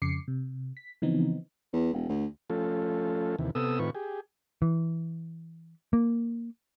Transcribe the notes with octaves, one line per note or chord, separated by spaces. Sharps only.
F2 C#3 D6 C7 C#7
C3
B6
C#3 E3 F3 B3 C4 D#4
E2
E1
D2
F3 A3 C#4 F4 A4
D#2 C3 E3
C3 B3 A4 D#6 E6
A2 D#3 C4 F4 B4 C#6
G4 G#4
E3
A#3